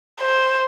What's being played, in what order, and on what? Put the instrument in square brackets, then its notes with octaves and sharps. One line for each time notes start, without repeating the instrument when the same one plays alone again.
[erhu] C5